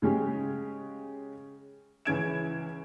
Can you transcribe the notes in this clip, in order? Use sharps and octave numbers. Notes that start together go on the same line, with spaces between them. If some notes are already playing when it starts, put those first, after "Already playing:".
C#3 G#3 C#4 G4
C#2 E3 C#4 G#6 D7 E7